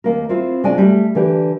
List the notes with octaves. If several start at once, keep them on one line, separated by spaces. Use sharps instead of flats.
D#2 A#3 A#4
C4 E4 F4
C3 G#3 D4 F4 D5 G#5
G3 A3
D3 E3 G4